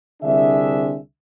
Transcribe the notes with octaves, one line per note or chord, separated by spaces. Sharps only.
C2 D3 C4 D4 G#4 E5